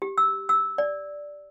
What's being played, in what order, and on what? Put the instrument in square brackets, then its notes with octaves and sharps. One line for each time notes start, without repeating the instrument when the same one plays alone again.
[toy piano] G4
E6
E6
D5